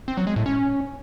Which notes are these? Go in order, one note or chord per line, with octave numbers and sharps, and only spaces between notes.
C4
F#3
G#3
A2
C#4